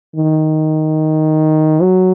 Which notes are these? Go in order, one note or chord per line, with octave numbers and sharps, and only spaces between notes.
D#3
F#3